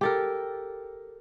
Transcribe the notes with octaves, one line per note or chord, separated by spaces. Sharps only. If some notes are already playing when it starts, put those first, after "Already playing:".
G4 A4 A#4